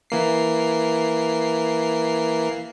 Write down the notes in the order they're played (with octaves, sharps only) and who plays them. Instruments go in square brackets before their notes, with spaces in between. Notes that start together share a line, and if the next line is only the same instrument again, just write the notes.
[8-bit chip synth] E3 A#3 C7